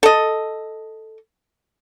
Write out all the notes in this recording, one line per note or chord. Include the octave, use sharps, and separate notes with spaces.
A4 D#5